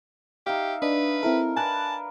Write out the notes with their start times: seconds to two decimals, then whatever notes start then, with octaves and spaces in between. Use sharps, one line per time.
0.46 D#4 G4 E5 F5
0.82 D4 B4 D#5
1.23 C4 E4 A4 A#4
1.56 D4 A#4 B4 G#5 A5 F#6